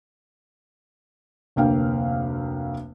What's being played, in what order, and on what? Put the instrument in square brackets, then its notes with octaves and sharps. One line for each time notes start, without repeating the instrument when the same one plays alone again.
[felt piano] F1 D2 A#3 F5 G5